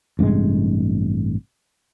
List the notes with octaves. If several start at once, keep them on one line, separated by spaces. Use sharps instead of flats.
A1 G2 C3 G#3